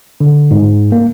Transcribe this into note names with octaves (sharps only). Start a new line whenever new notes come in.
D3
G#2
A#3